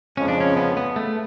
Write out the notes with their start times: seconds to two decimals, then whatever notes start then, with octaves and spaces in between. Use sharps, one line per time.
0.17 F2 C#3 F3 G#3 C#4
0.28 D4
0.40 C#4
0.57 B3
0.77 B3
0.96 A3